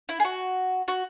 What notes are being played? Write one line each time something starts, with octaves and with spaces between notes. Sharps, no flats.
E4
G#4
F#4
F#4